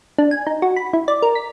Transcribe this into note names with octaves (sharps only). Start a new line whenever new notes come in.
D4
G#5
D#4
F#4
B5
E4
D5
A#4
B6